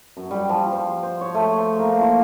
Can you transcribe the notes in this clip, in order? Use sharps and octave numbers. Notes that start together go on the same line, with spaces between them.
F#2
G3
F3
C5
C5
C#5
A3
C5
A#3
F4